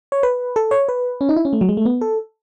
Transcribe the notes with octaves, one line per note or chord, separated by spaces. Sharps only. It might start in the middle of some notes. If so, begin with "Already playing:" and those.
C#5
B4
A4
C#5
B4
C#4
D#4
E4
C#4
A3
F#3
G#3
A3
B3
A4